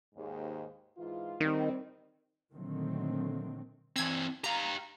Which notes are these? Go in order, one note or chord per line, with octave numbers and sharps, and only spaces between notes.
D#2 G#2
G#2 E3 F4
D#3 G3 C4
A#2 D3 D#3 F#3 A3 C4
E3 C4 E6 G#6
G4 F5 A#5